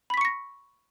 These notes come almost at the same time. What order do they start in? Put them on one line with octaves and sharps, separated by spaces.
B5 B6 C#6 C#7 A#6